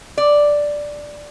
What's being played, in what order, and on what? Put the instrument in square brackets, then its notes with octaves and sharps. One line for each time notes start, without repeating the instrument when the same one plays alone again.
[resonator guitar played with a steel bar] D5